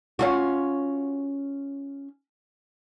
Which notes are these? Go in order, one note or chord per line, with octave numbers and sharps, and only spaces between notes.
C#4 F4 F#4